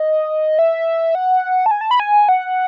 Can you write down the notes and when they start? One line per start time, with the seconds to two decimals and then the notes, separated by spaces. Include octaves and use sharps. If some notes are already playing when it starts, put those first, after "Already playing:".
Already playing: D#5
0.59 E5
1.15 F#5
1.66 A5
1.71 G#5
1.81 A5
1.91 B5
2.00 G#5
2.29 F#5